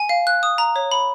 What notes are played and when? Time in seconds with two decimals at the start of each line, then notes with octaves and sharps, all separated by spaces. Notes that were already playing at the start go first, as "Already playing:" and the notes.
Already playing: G#5
0.09 F5
0.27 F#6
0.43 D#6
0.58 A#5
0.76 C#5
0.91 B5